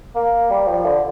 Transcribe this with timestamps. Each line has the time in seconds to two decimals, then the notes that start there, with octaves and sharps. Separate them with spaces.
0.16 A#3
0.50 G3
0.68 F3
0.85 D3